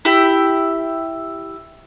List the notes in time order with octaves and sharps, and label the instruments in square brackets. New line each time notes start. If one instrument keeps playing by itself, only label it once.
[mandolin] E4 G4